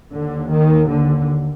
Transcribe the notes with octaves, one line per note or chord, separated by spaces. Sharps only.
D#2 D3
D#3
D3